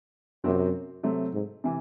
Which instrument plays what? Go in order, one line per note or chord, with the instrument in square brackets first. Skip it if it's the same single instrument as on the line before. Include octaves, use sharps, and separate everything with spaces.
[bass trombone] F#2 [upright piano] C3 F#3 C4 F#4
[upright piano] C3 F#3 A3 C4
[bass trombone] G#2
[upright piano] C3 E3